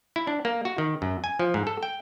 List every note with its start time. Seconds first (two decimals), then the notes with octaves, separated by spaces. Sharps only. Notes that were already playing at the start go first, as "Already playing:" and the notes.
0.16 E4
0.27 D4
0.45 A#3
0.65 F#4
0.78 D#3
1.02 F#2
1.24 G#5
1.39 F3
1.54 G#2
1.67 A4
1.83 G5